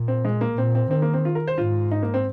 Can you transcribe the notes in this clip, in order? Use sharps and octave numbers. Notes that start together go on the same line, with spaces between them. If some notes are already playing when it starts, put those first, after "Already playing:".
Already playing: A#2
C4
G#3
A#3
A#2 C4
C4
D#3 C4
A#3
C4
F4
A#4
C5
G#2 F4
D#4
A#3
C4